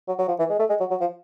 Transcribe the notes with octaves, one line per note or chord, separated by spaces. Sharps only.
F#3
F#3
F3
E3
G#3
A3
G#3
F#3
F#3
F3